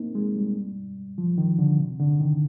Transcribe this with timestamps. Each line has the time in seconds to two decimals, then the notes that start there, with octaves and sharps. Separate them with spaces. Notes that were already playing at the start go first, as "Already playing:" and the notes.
Already playing: A#3 C4 D#4
0.15 G#3
0.35 G3
1.18 F3
1.38 D#3
1.59 D3
1.79 C3
2.00 D3
2.20 D#3